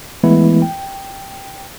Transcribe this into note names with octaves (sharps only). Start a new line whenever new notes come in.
E3 G#3 A3 B3 E4
G5